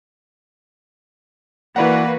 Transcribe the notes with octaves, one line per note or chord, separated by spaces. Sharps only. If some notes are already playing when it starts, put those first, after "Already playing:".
E3 A#3 F#4 B4 D5 F#5